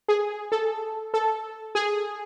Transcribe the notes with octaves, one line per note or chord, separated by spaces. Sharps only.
G#4
A4
A4
G#4